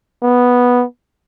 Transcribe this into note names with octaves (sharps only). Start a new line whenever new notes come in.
B3